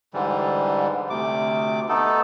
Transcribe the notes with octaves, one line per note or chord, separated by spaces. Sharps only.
G#2 D3 E3 G3
D2 C3 D6
A3 B3 D#4 A4